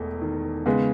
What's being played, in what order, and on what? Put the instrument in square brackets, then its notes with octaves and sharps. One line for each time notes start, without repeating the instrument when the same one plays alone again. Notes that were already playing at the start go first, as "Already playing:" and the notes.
Already playing: [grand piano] E1 E2 A3
D#3
[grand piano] C#3 [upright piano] G#3 B3